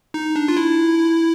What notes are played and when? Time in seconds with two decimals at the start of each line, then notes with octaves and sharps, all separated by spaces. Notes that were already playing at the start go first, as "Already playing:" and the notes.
0.14 D#4
0.36 D4
0.48 F4
0.57 E4